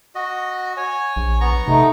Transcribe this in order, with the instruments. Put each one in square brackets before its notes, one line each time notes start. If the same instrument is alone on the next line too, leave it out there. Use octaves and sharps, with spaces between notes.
[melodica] F#4 D#5
C#5 G#5
[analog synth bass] A#1
[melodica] B3 A#5 C#6
[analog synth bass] C3 [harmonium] A3 D#4